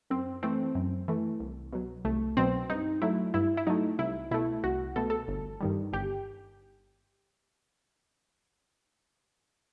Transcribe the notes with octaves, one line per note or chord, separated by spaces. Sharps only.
F#2 C4
E3 A3 C4
F#2
E3 A3
C2
B2 F#3
C2 A3
B2 F#3 C4
G2 D#4
F#3 A3 E4
G2 E4
E4
F#3 A3 D#4
C2 E4
B2 A3 E4
C2 F#4
B2 A3 A4
A4
G1
G2 D#3 G3
G1 G4